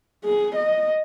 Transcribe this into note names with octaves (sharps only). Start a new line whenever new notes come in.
G#4
D#5